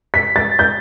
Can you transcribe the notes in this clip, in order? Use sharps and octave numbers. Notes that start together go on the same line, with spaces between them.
B6
A6
G6